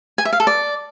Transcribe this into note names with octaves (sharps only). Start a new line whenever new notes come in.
G#5
E5
F5
A4
D5